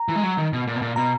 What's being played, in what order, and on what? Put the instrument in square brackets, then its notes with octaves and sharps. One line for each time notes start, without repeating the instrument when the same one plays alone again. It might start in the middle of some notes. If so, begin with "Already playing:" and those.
Already playing: [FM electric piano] A#5
[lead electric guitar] E3
G#3
F#3
D#3
B2
A#2
B2
A#2
[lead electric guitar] B2 [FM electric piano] A#5